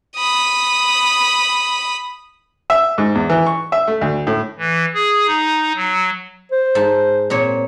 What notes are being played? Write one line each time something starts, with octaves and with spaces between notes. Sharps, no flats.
B5 D#6
E5
G#2
E2
E3
C#6
E5
A3
D2
A2
E3
G#4
D#4
F#3
C5
G#2 A5
A#2 C4 C#5